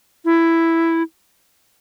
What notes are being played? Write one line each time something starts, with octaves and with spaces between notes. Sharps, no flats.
E4